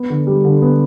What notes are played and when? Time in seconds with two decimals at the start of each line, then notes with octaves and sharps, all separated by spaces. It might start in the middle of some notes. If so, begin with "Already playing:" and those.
Already playing: B3
0.10 D3
0.27 G3
0.45 D3
0.62 B3